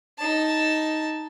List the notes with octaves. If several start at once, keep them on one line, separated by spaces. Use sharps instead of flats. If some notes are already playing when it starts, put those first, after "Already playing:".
D#4 A5